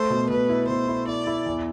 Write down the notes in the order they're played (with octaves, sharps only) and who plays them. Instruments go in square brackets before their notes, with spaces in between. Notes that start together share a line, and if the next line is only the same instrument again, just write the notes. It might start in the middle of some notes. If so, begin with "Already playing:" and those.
Already playing: [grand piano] A3 [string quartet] C5
[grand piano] B2
[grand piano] B2 [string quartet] B4
[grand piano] E4
[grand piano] B2 [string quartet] C5
[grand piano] E4
[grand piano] E4 [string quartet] D5
[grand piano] E4
E2